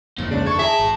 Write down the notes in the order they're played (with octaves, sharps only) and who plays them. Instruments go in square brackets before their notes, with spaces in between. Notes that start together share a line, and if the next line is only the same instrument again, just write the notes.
[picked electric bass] G1 F2 D#3 [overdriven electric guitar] A#2
[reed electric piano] C#2 C#3 [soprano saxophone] D4
[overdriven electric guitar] A4 [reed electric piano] C#6 G#6
[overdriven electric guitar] E4 A5 [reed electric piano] G#4 A#5 [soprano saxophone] E5
[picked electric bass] G#1